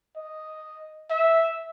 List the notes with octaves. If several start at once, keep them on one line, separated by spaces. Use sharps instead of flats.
D#5
E5